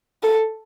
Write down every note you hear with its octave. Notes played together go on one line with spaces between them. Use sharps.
A4